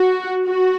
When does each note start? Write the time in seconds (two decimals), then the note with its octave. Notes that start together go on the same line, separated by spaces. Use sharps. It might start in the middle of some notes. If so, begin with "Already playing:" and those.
Already playing: F#4
0.46 F#4